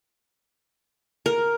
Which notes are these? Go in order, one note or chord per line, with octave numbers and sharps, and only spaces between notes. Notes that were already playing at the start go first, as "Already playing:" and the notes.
A#4